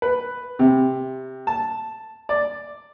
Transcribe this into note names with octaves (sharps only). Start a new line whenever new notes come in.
B4
C3
A5
D5